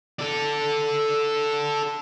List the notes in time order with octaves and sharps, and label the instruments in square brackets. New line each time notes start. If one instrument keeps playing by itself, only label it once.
[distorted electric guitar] A4 D5